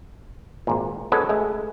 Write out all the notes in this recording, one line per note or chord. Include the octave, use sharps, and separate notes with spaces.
G#1 A#2
G#3 C#4 F#4 A4 B4 D#5
G#3 A3